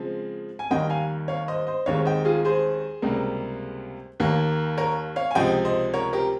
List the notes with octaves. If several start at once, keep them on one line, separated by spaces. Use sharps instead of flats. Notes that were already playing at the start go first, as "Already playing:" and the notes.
Already playing: C#3 F3 G#3 C4
G#5
D#2 D#3 G3 A#3 D#5 G5
F5 G#5
C#5 F5
C5 D#5
C5 D#5
D#2 D#3 G#3 C4 C#5 F5
D#5 G5
F4 G#4
G#4 C5
C#2 C3 G3 A#3
D#2 D#3 A#3
A#4 C#5
C#5 F5
G#5
C#2 C3 F3 D#5 G5
C5 D#5
A#4 C#5
G4 A#4